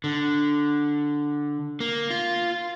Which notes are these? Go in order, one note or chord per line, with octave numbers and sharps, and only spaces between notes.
D3
A#3
F4